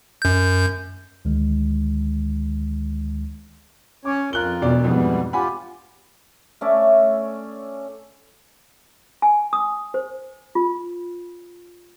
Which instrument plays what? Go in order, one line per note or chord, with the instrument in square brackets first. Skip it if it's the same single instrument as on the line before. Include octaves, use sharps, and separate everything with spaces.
[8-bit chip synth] F#2 G6
[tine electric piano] D2 D#3 G#3
[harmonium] C#4 C#5 [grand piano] D6
[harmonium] F2 F4 A#4 [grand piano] F#6 G7
[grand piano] E1 B2 D5
[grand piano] F2 G#2 B2 [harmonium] E3 G3 B3
[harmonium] F4 G4 [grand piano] F#5 G#5 B5
[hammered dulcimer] A3 C#4 D5 E5
[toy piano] G#5
D#6
C5
F4